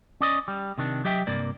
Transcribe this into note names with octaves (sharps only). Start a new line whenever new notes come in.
C#4 D5 D#5
G3
C3 D#3 D4
F#3 G4 D#5 E5 G5
C2 G2 A#3 D5